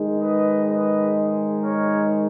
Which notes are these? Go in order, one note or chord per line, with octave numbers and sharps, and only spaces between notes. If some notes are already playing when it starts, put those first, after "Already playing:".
Already playing: G#2 D#3 G#3 D#4
B4 D#5
B4 D#5
A#4 C#5